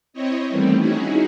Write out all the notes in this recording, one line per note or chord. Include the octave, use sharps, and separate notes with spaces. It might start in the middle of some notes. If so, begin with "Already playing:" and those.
C4 E4 C#5 D#5
D#3 E3 G3 A3 B3 C4
C#4 D#4 E4 F#4 G#4